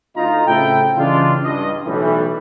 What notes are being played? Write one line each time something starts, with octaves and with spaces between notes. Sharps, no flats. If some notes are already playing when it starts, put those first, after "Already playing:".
D2 D#4 F4 A#5
A2 C#3 C4 E4 A4 G5
C#3 E3 G3 G#3 D4 F4
C#2 G2 D#5
B1 A2 E3 G3